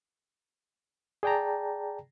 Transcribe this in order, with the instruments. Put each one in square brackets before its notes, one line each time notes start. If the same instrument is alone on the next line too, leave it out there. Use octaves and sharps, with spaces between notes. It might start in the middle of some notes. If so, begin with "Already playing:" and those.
[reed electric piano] G#4 D5 G5 A5 A#5